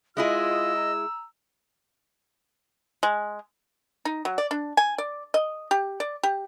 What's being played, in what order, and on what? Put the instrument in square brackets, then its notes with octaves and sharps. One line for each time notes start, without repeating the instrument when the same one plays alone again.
[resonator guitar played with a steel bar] G#3 E4 G#4 [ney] F4 [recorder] D#5 [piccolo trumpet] E6
[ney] A#5
[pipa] G#3
D#4
F#3
D5
D4
G#5
D5
D#5
G4
D5
G4